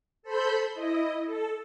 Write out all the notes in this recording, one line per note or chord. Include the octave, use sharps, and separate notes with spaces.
A4 C5 B5 C6 G6
E4 D#5
A4